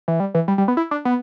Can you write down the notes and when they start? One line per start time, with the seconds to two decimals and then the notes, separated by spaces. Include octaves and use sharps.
0.08 E3
0.20 G3
0.35 E3
0.48 G3
0.58 G3
0.68 B3
0.77 E4
0.91 D4
1.05 B3